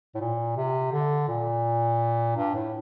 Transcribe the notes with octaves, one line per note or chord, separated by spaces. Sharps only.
A2
A#2
C3
D3
A#2
G2
A2